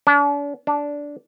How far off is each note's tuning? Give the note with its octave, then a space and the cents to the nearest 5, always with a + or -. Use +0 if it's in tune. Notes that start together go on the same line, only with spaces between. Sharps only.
D4 -40
D4 -10